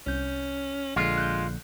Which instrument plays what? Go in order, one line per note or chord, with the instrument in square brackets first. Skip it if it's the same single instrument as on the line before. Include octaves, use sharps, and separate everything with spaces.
[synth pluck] C2 G6 [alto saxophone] C#4
[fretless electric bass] A#1 D3 [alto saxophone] G#3 [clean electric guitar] F4
[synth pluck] F#6 G6